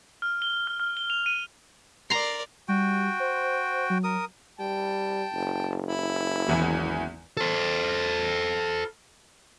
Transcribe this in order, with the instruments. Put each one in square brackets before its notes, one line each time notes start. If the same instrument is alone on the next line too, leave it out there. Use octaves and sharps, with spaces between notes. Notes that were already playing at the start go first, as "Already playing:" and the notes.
[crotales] F6
G7
F6
F6
G7
F7
D#7
[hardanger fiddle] A#4 D5 [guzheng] A#5 C6
[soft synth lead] G3 [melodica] F#4 G5
[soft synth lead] C5
F#3
[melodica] A#4 D#6
[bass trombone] G3 [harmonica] G5 A5
[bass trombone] F#1
[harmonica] E4
[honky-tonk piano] G#1 E2 E3
[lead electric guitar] A4 C5